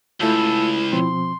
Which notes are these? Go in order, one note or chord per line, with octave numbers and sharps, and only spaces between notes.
C#2 A3 E4 F4 A4
B2 F3 C4 C6